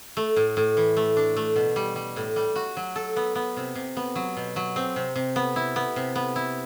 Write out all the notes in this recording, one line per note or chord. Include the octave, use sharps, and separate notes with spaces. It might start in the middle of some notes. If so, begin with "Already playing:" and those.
A3
A2
A2
E3
A3
D4
A3
B2
G3
G3
A2
G3
F#4
F#3
A4
B3
B3
C3
C3
B3
F#3
B2
F#3
C4
C3
C3
B3
E4
B3
C3
B3
E4